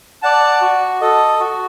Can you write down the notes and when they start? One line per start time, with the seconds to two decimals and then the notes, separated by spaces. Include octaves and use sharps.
0.22 D5 F#5 A5
0.62 F#4
1.01 A4 D#5
1.40 F#4